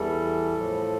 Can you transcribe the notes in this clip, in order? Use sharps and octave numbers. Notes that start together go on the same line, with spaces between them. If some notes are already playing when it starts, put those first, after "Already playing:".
Already playing: E2 E3 G3 A4
A2 F3